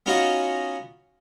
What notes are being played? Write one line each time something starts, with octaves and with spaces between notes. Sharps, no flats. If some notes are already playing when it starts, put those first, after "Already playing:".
B3 C#4 D#4 F4 F#4 D#5